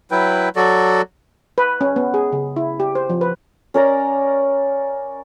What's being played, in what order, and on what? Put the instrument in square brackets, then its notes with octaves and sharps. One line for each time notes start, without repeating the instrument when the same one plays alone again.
[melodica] F#3 E4 B4 G5
F#3 F#4 A4 D5
[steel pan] B4
C#4
B3
G#4
C#3
E4
G4
C5
F3
B4
[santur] C#4 A#4 D5 A#5